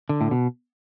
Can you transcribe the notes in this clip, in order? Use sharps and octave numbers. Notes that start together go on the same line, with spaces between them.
D3
A2
B2